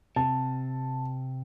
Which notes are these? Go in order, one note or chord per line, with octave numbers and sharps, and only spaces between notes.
C3 A5